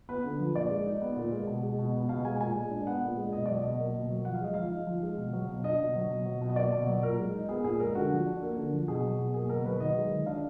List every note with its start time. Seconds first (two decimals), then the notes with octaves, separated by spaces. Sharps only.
0.09 B3 B4
0.24 D3
0.39 F3
0.55 A#2 D5
0.70 G#3
0.86 D#4
1.02 B3
1.16 A#2
1.32 G#3
1.47 B2
1.63 G#3
1.78 B2
1.94 B3
2.09 B2 F5
2.24 G#3 G#5
2.40 A#2 G#5
2.56 G#3
2.71 D4
2.87 B3 F#5
3.02 A#2
3.17 G#3
3.33 B2 D#5
3.46 F#3 D5
3.58 D#5
3.63 B2
3.79 A#3
3.94 B2
4.10 F#3
4.25 F3 F#5
4.34 F5
4.41 G#3 D#5
4.54 F3 F5
4.71 D#4
4.87 F3
5.02 G#3
5.17 B2
5.33 F#3
5.48 B2
5.64 D4 D#5
5.80 B2
5.95 F#3
6.10 B2
6.26 F#3
6.41 B2
6.50 D#5
6.56 A#3 D5
6.72 B2
6.87 F#3
7.02 A#2 A#4
7.19 G#3
7.34 D#4
7.49 B3 G#4
7.64 A#2 G#4
7.80 G#3 A#4
7.95 D3 F#4
8.11 F3
8.26 D4
8.42 A#3
8.57 D3
8.73 F3
8.88 B2 G#4
9.03 F#3
9.19 B2
9.34 A#3 G#4
9.49 B2 A#4
9.65 F#3 B4
9.80 D#3 D#5
9.96 G#3
10.11 D#3
10.26 D4 F5